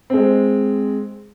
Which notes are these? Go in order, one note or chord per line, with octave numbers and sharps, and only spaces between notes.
G#3 C4